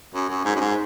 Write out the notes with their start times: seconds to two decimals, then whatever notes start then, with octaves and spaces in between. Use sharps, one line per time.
0.14 F#2
0.29 F#2
0.45 G#2
0.56 F#2
0.60 G#2